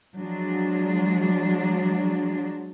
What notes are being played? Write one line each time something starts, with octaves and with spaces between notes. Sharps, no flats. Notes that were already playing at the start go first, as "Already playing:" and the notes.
F3 F#3 G#3 D4